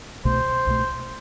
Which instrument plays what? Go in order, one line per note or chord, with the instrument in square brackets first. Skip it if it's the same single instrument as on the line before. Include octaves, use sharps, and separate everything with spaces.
[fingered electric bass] C2 B2 A3 [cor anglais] C5
[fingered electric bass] C2 B2 A3